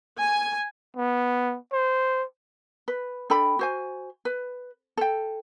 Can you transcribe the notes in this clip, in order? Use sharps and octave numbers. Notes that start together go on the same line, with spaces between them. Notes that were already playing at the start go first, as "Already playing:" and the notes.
G#5
B3
C5
B4
D4 A4 G5 B5
F#4 C5 G#5
B4
A4 G5